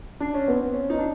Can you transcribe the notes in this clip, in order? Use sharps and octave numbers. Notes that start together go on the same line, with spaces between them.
D4
C#4
B3 C4
C#4
D#4
D4